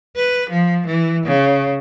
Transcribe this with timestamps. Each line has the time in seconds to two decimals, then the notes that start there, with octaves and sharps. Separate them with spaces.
0.16 B4
0.50 F3
0.86 E3
1.26 C#3